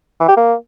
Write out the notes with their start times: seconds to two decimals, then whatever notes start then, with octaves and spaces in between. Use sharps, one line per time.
0.20 E3
0.28 G4
0.37 A#3